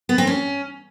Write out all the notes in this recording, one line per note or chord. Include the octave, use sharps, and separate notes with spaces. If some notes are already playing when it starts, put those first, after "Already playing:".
B3
C4
C#4